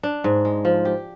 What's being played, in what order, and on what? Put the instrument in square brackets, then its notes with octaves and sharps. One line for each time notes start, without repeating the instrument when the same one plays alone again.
[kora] D4
G#2
G#3
F3
G4